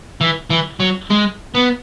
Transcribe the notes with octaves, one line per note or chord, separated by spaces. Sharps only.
E3
E3
F#3
G#3
B3